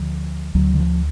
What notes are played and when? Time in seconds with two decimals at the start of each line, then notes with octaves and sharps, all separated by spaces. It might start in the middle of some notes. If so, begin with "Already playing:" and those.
Already playing: D2 D3 F3
0.55 D2 D3 F#3
0.74 D3
0.80 F3